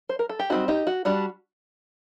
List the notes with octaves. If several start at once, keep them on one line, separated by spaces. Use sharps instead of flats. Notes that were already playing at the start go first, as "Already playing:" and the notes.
C5
A#4
A4
G4
G3 C4 D#4 F#4
D#4 G4
F#4
G3 D4 F#4